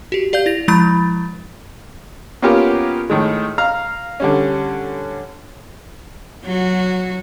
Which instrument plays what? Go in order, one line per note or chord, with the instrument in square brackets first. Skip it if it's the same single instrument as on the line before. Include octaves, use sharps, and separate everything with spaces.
[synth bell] F#4 G4
G4 D5 F5 G6
E4 A#6 F7
F3 G#3 E4 B5 G6 A6
[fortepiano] A#3 B3 C#4 F4 G4 A#4
A2 D#3 G#3
F5 A#5 F6
D3 G3 C#4
[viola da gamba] F#3 F#4